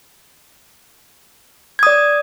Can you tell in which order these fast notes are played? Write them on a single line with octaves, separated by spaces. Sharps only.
G#6 D#6 D5